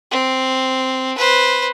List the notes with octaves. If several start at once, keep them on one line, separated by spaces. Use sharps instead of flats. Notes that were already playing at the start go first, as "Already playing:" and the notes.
C4
B4 C5